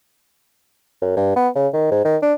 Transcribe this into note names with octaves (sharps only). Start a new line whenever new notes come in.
F#2
G2
B3
C#3
D#3
G#2
D#3
D4